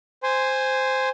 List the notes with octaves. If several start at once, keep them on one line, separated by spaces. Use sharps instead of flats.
C5 G#5 C6